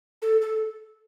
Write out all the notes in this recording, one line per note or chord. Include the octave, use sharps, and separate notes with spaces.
A4
A4